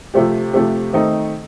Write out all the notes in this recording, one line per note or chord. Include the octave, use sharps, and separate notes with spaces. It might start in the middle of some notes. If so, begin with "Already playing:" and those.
C3 F3 A3 C4 G4
C3 F3 A3 C4 G4
D#3 A3 C4 D#4